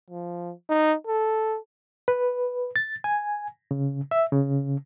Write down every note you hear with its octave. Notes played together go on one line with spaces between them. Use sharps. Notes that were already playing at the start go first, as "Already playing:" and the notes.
F3
D#4
A4
B4
A6
G#5
C#3
E5
C#3